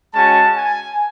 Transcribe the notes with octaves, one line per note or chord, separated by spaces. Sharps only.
G#3 C#4 F#4 A5
G#5